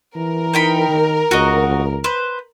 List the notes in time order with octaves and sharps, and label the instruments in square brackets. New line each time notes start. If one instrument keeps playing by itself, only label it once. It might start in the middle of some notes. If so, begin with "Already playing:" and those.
[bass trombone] E3 [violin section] A#4
[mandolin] D#4 G5 B5
[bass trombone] D#3
[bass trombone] C#2 [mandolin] F#4 D#5
[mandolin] B4 C5